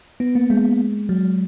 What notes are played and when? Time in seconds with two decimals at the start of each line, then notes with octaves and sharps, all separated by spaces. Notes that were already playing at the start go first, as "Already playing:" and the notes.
0.20 B3
0.35 A#3
0.50 G#3
1.09 F#3